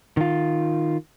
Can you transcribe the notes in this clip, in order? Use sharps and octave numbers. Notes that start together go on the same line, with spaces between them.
D#3 F4